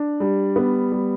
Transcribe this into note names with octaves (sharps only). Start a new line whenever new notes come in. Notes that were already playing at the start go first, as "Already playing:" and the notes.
Already playing: D4
G3
B3
G3